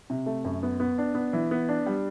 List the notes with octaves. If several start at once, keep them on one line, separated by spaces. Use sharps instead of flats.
C3
A3
F#2
B3
B3
D4
B3
E3
B3
D4
G3